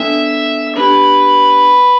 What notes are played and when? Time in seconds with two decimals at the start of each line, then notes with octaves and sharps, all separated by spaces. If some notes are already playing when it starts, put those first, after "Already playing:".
Already playing: B3 D4 A4 E5 G5
0.75 B3 D4 G4 B4